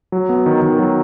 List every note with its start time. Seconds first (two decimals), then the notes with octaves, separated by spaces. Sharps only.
0.12 F#3
0.29 B3
0.46 D#3
0.62 D#3
0.79 F#3